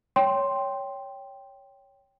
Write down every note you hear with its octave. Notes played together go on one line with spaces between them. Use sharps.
C#5 G5 C6